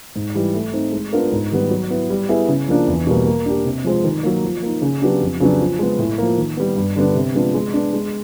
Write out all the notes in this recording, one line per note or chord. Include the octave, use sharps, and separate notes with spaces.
G#2
E3 G3
A3
C4 D#4
G#3
B3 D4 F4 A#4
G#2
D#3 G3 B3
F#3
B3 E4
G3
B3 E4 G#4
C#3
F3 A#3 D4
E2
B2 G3 A#3
A#3
D4 G4
C3
F3 G#3 C4
D#3
F#3 A#3
F3
A#3 D#4
C#3
F#3 B3 D4 G4
F2
C#3 F#3 B3 D4
F3
G#3 B3
A2
F3 A#3
D#3
G3 B3
G2
D3 G3 B3 D4
C3
F3 G#3 B3 D4
G#3
B3 D4
G#3